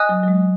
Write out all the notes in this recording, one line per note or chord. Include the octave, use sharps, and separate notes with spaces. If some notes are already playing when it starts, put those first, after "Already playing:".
Already playing: D#5 G#5 D#6 F#6
F#3
F#3
G#3